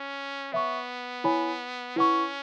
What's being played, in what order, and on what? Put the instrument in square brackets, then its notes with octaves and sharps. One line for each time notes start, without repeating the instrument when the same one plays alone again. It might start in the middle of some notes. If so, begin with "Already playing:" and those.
Already playing: [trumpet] C#4
[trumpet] B3 [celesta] C#5 E5 C#6
[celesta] E4 C#5 G#5 B5
[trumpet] C#4 [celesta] E4 B4 F#5 C#6